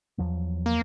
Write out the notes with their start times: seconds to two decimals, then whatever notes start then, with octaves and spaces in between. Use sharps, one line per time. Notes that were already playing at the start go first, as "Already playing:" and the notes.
0.18 E2 F3 F#3
0.66 A#3